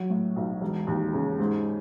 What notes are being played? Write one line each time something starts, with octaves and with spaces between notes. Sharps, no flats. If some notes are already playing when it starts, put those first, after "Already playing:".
Already playing: F#3
A2
B1
E1
D#2
C#3
G#2